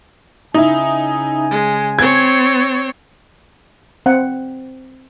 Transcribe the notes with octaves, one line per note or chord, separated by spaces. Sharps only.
C#3 D#4 E4 G#5
G#3
C4 C#5 G#6
C4 F#5